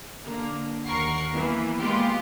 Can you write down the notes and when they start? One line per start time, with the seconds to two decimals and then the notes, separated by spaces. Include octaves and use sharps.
0.25 D3 A#3
0.86 D#2 A#4 F#5 C#6 C7
1.33 E3 A#3 B3
1.78 G#3 A#3 B3 F4 G4